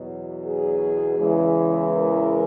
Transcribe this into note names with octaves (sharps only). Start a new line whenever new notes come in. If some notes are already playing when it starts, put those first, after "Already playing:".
Already playing: E2 B2 F#3
G#4
E2 C#3 E3 G#3
A#4